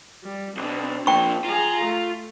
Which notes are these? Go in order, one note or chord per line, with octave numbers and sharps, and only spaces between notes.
G3
B1 B2 C4 D4
A#2 F3 G5 C#6
F4 G#4 A#5
A3